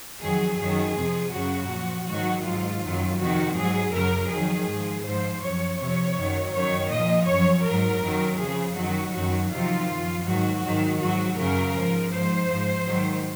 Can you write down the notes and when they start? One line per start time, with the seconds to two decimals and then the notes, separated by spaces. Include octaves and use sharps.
0.20 F2 D#3 F#3 G#4
0.57 F#2 D#3 F#3 G#4
0.94 F2 C3 F3
1.32 F#2 C#3 F#3 F#4
1.69 A#2 F3
2.06 G#2 D#3 F#3 F#4
2.43 G#2 F#3 F4
2.81 F#2 D#3 F#3
3.18 F2 C3 D#3 F#4
3.55 G#2 F#3 G#4
3.92 F#2 C#3 F#3 A#4
4.29 F2 D#3 F#3 G#4
4.66 G#2 F3
5.03 G#2 F3 C5
5.41 F#2 F3 C#5
5.78 F2 C3 F3 C#5
6.15 F#2 D#3 F#3
6.52 F#2 D#3 F#3 C#5
6.90 A#2 F3 D#5
7.27 F#2 F3 C#5
7.64 G#2 F#3 A#4
8.01 F#2 D#3 F#3
8.38 F2 C#3 F3 G#4
8.75 F#2 D#3 F#3 F#4
9.13 F#2 D#3 F#3 F#4
9.50 F2 C3 D#3 F#3 F4
9.87 F#2 F3
10.24 G#2 D#3 F#3 F#4
10.61 G#2 D#3 F#3
10.99 G#2 F#3 F#4
11.36 F#2 C#3 F#3 A#4
11.73 G#2 F3
12.10 G#2 F3 C5
12.48 G#2 F3
12.85 G#2 D#3 F#3